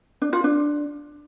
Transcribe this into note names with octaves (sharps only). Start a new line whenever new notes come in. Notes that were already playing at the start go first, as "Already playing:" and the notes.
D4
F4
D4